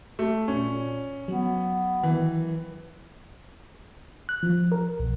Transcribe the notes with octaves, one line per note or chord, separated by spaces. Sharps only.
A3
A#2 C#4
F#3 B3
D#3 E3
F#6
F3
A#4
B1